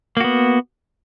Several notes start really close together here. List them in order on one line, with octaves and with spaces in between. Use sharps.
A#3 F#4 B3